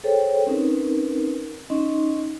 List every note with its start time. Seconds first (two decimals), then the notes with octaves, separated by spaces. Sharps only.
0.04 G#4 A4 C5 C#5 G5
0.47 C4 C#4 D#4 A#4 B4
1.70 C#4 D#4 D#5 C6